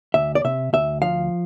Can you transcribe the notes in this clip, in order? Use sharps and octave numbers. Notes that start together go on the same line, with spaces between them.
D2 E5
D5
C3 E5
D2 E5
F3 F5